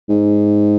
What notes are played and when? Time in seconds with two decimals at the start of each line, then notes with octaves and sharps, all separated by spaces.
0.09 G#2